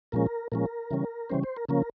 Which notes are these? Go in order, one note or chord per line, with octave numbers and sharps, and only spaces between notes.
A#2 F3 G#3 C#4 A#4
A#2 F3 G#3 C#4 A#4
C#3 E3 G3 C#4
C#3 E3 G3 C#4 C5
C5
A#4
C#3 F3 A#3 C#4 A#4